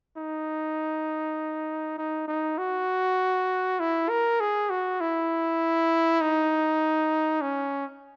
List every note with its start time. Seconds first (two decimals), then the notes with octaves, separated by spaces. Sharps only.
0.17 D#4
1.98 D#4
2.28 D#4
2.58 F#4
3.80 E4
4.10 A#4
4.40 G#4
4.70 F#4
5.01 E4
6.21 D#4
7.41 C#4